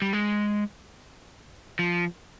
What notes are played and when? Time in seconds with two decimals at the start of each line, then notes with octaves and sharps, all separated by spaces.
0.02 G3
0.13 G#3
1.79 F3